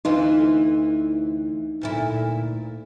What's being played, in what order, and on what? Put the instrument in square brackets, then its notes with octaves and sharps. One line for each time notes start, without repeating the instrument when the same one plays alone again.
[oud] D2 E3 F4 [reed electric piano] D#4
[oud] D2 A#2 E4